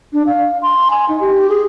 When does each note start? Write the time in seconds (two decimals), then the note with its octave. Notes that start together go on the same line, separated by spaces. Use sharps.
0.13 D4
0.26 F5
0.62 C6
0.90 G#5
1.09 D#4
1.20 G4
1.49 G#4